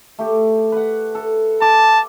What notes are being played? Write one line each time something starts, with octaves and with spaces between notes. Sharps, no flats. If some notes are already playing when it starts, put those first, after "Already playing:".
A3 G4
B4 F#5
A4
A5 D6